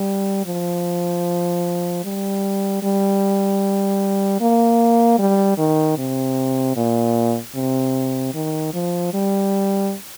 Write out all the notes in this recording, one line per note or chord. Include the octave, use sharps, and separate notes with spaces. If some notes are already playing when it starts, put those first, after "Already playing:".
Already playing: G3
F3
G3
G3
A#3
G3
D#3
C3
A#2
C3
D#3
F3
G3